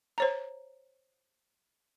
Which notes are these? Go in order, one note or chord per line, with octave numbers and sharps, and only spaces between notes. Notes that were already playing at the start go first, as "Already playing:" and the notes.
C5 C#5 A#5